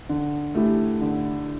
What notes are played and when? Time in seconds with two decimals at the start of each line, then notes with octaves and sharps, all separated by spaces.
0.09 D3
0.55 A3 E4 G4
1.01 D3